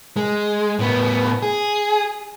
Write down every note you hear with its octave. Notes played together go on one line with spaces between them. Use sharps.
G#3
A2 B3
G#4